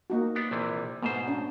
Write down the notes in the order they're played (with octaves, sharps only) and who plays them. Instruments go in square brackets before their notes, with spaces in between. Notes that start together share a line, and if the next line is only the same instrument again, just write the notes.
[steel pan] A#3 D#4 F#4
[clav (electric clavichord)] B3 D4
A#1 C3 E3
[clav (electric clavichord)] G#2 B2 C5 [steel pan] A3 B3
[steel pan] C#4 D4